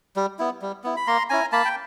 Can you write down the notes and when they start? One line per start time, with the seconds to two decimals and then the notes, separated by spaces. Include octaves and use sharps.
0.16 G3
0.39 B3 E4
0.62 G3
0.84 B3 E4
0.97 B5
1.07 A#3 A#5 C6
1.30 C#4 E4 G#5 A#5
1.52 A#3 A5 B5
1.65 G5